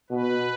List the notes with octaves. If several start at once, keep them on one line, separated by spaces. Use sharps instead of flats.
B2 B4